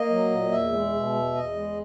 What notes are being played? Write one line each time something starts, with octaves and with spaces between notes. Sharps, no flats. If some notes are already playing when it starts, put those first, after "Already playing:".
Already playing: A#3 D#5
F#3
A#2
E2 E5
G#3
B2
E2
E2 D#5
G#3